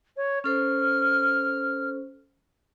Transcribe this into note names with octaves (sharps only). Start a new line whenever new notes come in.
C#5
C#4 A4 C5 F6